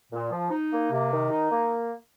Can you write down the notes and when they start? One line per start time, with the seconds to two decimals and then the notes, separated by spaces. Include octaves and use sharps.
0.12 A#2
0.31 F3
0.51 D#4
0.71 A#3
0.91 C3
1.10 D#3
1.30 D#4
1.49 A#3